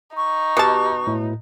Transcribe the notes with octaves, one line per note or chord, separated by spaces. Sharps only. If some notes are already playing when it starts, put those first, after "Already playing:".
D#4 C#6
B2 G4 A5 D6
A2